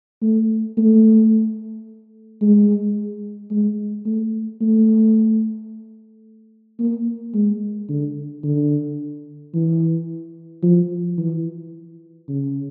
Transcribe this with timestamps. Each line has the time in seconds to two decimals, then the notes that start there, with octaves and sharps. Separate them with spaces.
0.22 A3
0.77 A3
2.41 G#3
3.51 G#3
4.05 A3
4.61 A3
6.79 A#3
7.34 G#3
7.89 D3
8.43 D3
9.54 E3
10.63 F3
11.18 E3
12.28 C#3